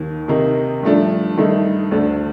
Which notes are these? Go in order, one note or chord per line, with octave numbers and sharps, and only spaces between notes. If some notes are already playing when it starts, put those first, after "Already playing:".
Already playing: D#2 D#3 A#3
C3 D#3 A#3 D#4
G2 F3 A3 D4
G2 D#3 A3 D#4
D2 D3 A3 D4